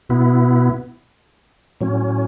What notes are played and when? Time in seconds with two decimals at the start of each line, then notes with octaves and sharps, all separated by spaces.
0.09 B2 B3 E4
1.81 A2 F#3 C#4